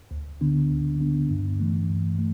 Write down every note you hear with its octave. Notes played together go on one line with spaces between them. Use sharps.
D2
D3 B3 D4
D2
D3 B3 D4
G2
E3 A3
G2
A3